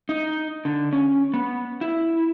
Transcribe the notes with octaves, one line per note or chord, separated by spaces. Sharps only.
D#4
D3
C#4
B3
E4